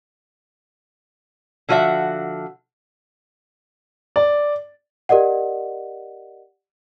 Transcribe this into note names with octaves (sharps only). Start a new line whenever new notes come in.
D3 F3 F#4 C#5 E5 F#5
D5
G4 A#4 D5 D#5 F#5